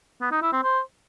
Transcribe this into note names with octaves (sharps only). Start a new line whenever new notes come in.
B3
D#4
E4
C4
C5